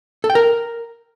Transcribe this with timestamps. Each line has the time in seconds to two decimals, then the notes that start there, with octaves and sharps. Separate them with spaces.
0.24 A4
0.30 G5
0.35 A#4